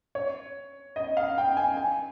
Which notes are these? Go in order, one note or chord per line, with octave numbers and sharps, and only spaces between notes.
C#5
D#5
F5
G5
G#5
G#5